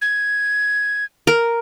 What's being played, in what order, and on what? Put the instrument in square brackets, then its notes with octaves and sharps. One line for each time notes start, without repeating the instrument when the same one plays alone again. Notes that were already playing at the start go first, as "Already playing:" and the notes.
[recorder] G#6
[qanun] A#4